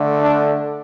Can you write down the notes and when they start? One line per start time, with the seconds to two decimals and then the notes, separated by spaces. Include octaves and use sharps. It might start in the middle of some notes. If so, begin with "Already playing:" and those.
Already playing: D3 A3
0.22 D4